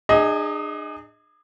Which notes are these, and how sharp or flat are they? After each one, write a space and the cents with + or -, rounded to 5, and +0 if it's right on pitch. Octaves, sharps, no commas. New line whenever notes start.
D4 +45 G#4 -10 D#5 +20